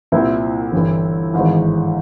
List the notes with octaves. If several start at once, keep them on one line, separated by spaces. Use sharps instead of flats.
C2 A#2 C4 E4
G1 G2 E3
G#1 G#2 E3